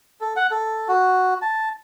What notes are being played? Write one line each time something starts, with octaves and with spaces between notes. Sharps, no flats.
A4
F#5
A4
F#4
A5